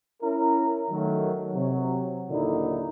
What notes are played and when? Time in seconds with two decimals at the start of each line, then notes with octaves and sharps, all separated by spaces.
0.22 C#4 E4 A#4
0.90 D#3 F#3 A3
1.54 C3 F#3
2.29 D#2 A#2 D3 F#3 D#4 E4